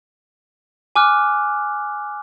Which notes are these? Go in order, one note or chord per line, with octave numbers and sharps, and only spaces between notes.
G#5 D6 F6 F#6